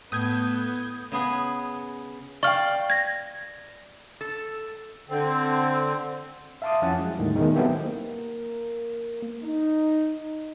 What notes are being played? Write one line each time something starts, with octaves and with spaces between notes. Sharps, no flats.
A2 B3 D#6 G6 G#6
C#3 B3 G#4
D5 F5 G5 C#6 F6
G#6 A#6
A4
D3 C4
E5 F5 A5 C6 D6 D#6
F2 F3 C#4 E4 F#5 A5
F#3 G#3
D#2 A2 D3 D#3 G3
B2 D#3 G#3 A3 B3 D#4
F#3 B3 C4 E4 G4 A4
A#3
D#4